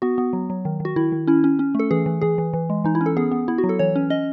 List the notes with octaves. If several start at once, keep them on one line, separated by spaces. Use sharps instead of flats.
B3 F#4
B3
F#3
F#3
D#3
D#3
F#4
D#3 E4
D#3
C#4 E4
C#4
C#4
A3 A4
E3 G#4
E3
E3 G#4
E3
E3
G#3
E3 D#4
E4
C#4
A4
B3 G#4
B3
B3 E4
F#4
F#3
A4
E3 C#5
C#4
C#4 D#5